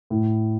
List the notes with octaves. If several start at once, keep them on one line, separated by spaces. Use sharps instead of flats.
A2